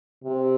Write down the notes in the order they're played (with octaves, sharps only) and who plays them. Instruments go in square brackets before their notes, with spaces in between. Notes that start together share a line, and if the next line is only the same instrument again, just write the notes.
[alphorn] C3